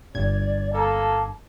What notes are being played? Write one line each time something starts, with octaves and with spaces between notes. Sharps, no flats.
G1 G2 D5 G#6
A#3 A4 A5